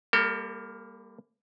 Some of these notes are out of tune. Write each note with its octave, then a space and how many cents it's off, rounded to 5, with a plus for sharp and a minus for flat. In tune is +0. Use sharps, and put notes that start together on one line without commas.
G3 +30 A#3 +0 A4 +40